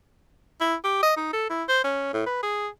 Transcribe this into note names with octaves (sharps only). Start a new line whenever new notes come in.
E4
G4
D#5
D#4
A4
E4
C5
C#4
A2
B4
G#4